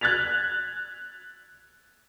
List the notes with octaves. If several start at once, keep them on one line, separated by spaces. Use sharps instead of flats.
F#6 G#6 A6 B6 F7